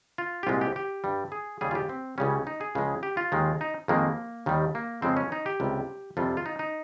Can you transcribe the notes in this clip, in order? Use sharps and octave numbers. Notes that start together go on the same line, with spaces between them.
F4
G4
C2 A#2 G#3 F4
G4
G4
G2 G3
G#4
D#2 C#3 G3 G#4
F4
G4
C4
C#2 C#3 G3 C#4
D#4
G#4
C#2 C#3 F3 G#3
G4
F4
D#2 D#3 G#3
D#4
F2 D#3 G#3 A#3
D#2 D#3 G3
A#3
F2 C#3 G#3 C4
C#4
D#4
G4
C#2 C3 G3
F2 C3 G3 F4
F4
D#4
D#4